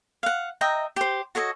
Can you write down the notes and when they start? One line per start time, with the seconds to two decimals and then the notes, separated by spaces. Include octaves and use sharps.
0.23 F5 F#5
0.61 D#5 E5 G5 A#5
0.96 G4 C5
1.35 F#4 A4 C#5 D#5